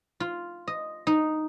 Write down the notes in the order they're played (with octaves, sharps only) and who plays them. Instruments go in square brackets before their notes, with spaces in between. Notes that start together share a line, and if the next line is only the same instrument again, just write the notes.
[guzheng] F4
D#5
D#4